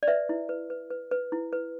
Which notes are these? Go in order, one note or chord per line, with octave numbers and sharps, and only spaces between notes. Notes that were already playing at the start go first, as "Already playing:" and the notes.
D5
B4 E5
E4
B4
B4
B4
B4
E4
B4